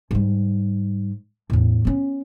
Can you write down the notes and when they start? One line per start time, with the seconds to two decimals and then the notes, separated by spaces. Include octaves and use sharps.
0.11 G#2 G3
1.50 E2 A2
1.85 B3 C#4